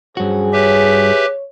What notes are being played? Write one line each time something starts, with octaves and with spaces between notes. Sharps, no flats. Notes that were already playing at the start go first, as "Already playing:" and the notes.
G2 F#3 C#4 F#4 G#4 C5
G4 B4 C#5 E5